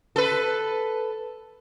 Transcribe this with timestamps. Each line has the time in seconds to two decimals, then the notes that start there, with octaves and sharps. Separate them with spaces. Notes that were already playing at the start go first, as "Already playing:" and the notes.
0.16 A4 B4